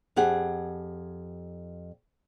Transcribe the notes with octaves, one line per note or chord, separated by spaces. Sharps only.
F2 G4 G#4 F#5